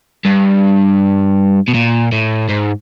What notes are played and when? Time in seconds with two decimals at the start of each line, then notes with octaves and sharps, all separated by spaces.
0.25 G2
1.68 B2
1.74 A#2
2.12 A2
2.49 G#2